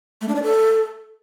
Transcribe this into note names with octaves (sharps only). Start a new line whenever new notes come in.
A3
D4
D5
A4